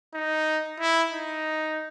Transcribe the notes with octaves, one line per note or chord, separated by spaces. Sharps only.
D#4
E4
D#4